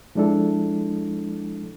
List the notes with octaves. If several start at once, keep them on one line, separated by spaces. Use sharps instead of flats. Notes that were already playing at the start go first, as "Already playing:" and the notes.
F3 G#3 D4 E4 A4